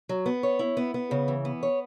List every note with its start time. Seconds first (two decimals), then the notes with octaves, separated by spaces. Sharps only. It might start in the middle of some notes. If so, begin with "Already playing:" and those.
0.09 F#3
0.26 B3
0.43 C#5
0.59 E4
0.77 B3
0.94 B3
1.11 C#3
1.28 E3
1.45 B3
1.63 C#5